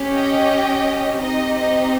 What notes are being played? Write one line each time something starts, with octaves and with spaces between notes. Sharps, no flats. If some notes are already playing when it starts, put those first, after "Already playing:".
Already playing: C#4 G4
D#5 G5
C4 D#4 G4 D#5
D#5